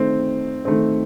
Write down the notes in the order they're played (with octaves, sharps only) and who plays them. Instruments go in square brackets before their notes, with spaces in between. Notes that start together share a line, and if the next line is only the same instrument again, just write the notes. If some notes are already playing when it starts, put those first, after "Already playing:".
Already playing: [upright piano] D#3 A3 C4
D#3 A3 C4